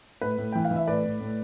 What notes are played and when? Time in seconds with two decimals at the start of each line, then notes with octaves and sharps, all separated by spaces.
0.21 A2 B4
0.38 A2
0.52 E3 G5
0.65 F5
0.71 E3
0.76 E5
0.87 A2 B4 D5
1.04 A2
1.21 A2